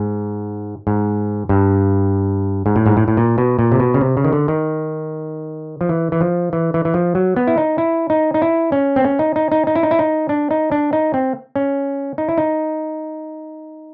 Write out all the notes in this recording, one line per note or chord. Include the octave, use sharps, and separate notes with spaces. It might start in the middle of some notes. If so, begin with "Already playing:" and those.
Already playing: G#2
G#2
G2
G#2
A2
G#2
A2
A2
A#2
B2
A#2
C3
B2
C#3
C3
C#3
D#3
D3
D#3
F3
E3
E3
F3
E3
E3
E3
F3
F#3
B3
E4
D#4
E4
D#4
D#4
E4
C#4
C4
C#4
D#4
D#4
D#4
D#4
E4
D#4
E4
D#4
D4
D#4
D4
D#4
C4
C#4
D#4
E4
D#4